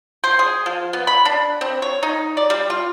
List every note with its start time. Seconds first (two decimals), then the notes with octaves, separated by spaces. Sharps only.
0.24 C5
0.39 G#4
0.66 F3
0.93 B3
1.07 B5
1.25 D4
1.61 C4
1.82 C#5
2.03 D#4
2.37 D5
2.50 G3
2.70 F4